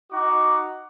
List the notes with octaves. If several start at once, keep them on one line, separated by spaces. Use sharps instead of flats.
D#4 F#4 F#5 D6